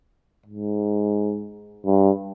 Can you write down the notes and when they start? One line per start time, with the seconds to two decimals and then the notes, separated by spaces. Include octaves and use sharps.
0.46 G#2
1.86 G2